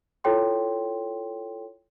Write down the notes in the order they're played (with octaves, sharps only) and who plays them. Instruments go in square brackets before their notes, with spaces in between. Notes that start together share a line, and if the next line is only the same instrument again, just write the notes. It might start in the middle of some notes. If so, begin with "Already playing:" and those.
[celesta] E4 F4 A4 C#5 G5 C6